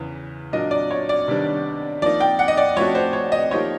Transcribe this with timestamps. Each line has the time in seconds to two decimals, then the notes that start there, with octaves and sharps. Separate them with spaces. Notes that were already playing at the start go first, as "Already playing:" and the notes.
Already playing: E2 C#3 E3
0.52 A#2 F#3 A#3 D4 D#5
0.71 D5
0.91 C#5
1.09 D5
1.28 C3 D#3 G3 B3 D4
2.02 F3 A#3 D#4 D5
2.20 G5
2.39 F#5
2.48 D#5
2.57 D5
2.76 F3 A3 C#4 F#4 C#5
2.95 C5
3.13 C#5
3.32 D#5
3.51 F3 A#3 D#4 G4 C5 C#5